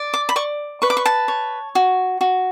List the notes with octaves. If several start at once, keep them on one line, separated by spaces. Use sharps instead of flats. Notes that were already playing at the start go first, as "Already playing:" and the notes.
Already playing: D5
D6
B5
D5 C#6
B4 C#6
D6
C#6
A5
C#5
F#4
F#4